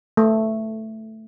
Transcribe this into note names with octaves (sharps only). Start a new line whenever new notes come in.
A3